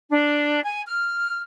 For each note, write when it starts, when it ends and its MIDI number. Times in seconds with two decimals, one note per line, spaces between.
0.10 0.63 62
0.63 0.83 80
0.86 1.40 89